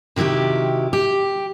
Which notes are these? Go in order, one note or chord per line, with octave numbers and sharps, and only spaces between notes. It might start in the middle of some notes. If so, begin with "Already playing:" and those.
C3 D#3 E4 F#4 G4
G4